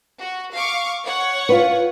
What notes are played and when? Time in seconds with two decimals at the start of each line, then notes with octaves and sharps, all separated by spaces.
0.21 F#4
0.54 F5 C#6 D6
1.05 C#5 F#5 C#6
1.49 F4 B4